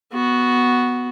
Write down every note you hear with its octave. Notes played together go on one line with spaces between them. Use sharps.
B3 F#4